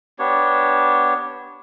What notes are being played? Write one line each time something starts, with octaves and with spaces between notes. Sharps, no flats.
B3 D4 G4 C#5